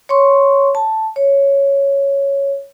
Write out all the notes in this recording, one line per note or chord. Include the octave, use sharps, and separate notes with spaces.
C#5 C6 C#6
A5
C#5